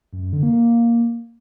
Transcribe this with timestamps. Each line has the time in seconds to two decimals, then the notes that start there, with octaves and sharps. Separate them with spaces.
0.13 F#2
0.23 F#2
0.33 D3
0.43 A#3
0.53 A#3